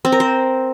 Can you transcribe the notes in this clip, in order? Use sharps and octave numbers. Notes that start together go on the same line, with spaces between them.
C4
A#4
C5